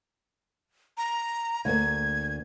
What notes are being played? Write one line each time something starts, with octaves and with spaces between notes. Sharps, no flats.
A#5
D2 A#3 G#6